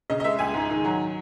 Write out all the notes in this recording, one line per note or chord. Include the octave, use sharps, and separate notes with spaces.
C#3 D#5
D#5
G#3 E5
C#2 G#5
G#2
D#3
F#3